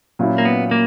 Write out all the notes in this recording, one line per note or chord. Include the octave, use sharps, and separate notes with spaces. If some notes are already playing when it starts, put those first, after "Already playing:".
A#2 F#3 C#4 E4
A#3
B3
A#3